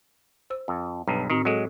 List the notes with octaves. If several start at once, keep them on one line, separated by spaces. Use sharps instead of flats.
C5 E6
F2
B1 G2 A#5
A2 D#3 C4 F#4
F#3 G#3 A4